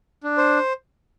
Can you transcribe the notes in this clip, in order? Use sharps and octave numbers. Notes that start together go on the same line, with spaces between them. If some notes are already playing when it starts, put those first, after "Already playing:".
D4
C5